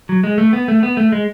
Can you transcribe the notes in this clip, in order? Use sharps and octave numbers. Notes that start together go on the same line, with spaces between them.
F#3
G#3
A3
B3
A3
B3
A3
G#3